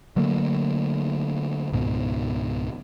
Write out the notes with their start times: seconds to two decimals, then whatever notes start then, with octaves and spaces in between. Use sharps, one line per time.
0.16 D3 F#3 A3 A#3
1.72 C#2 G#2 B2 D#3